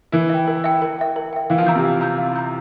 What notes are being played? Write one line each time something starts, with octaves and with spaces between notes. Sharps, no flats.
E3 E4 A#4
E5 G5
A#4
E5 G5
A#4
E5 G5
A#4
E5 G5
E3 E4 F5
F3 F4
E3 E4 A#5 E6 G6
C3 C4
F5
A#5 E6 G6
F5
A#5 E6 G6